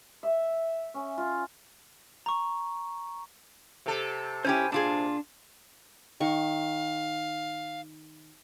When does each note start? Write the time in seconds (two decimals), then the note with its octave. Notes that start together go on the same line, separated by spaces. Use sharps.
0.23 E5
0.94 C#4
1.18 F4
2.26 A#5 C#6
3.86 C3 A4
4.45 C#4 E4 G4 C5 G#5
4.72 A#2 D4 F4 G#4 A5 D6
6.20 D#3 F5 C#6